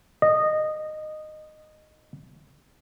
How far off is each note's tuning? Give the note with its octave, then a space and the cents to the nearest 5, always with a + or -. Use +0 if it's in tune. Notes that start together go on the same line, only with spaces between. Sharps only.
D#5 -15